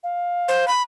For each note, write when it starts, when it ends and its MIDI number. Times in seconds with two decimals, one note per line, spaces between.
0.03 0.70 77
0.48 0.68 72
0.68 0.82 83